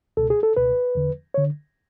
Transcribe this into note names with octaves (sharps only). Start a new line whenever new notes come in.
C#2 B2 A4
G#4
A4
C#2 B2 B4
E2 D3
D3 C#5